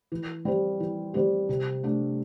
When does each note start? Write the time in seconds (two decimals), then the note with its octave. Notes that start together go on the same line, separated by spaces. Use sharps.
0.12 E3
0.45 G3 C4 G4
0.80 E3
1.14 G3 C4 G4
1.49 C3
1.83 A3 D4